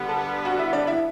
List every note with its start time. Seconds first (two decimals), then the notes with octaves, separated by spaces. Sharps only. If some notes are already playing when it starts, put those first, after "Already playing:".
Already playing: D3 G3 B3
0.08 A4 A5
0.45 F#4 F#5
0.59 E4 E5
0.73 D4 D5
0.87 E4 E5